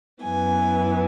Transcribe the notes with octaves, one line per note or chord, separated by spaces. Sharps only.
F#2 E3 B3 G#5